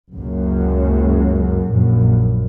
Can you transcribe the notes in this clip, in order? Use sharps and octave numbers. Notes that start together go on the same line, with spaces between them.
F#1 C#2 F#2
A#1 F#2